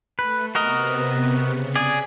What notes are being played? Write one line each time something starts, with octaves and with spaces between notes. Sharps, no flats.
A3 B4
C3 B3 F#4 A#4 D#5
C#3
G#4 D5 F#6 B6